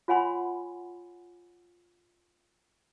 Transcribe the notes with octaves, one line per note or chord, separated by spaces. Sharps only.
F4 C#5 F#5 G#5 B5 C6